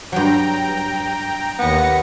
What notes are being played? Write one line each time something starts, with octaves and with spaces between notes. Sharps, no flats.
G2 F#3 G5 A#5
D#2 B3 A#6 C#7